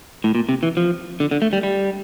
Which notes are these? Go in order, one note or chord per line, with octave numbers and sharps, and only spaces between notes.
A2
A#2
C3
E3
F3
D3
D3
A3
G3
G3